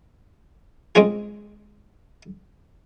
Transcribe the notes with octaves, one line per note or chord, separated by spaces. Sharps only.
G#3 C4 C#4 F4 G#4